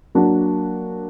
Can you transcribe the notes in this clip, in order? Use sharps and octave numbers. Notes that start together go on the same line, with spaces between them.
F#3 A#3 D4 F#4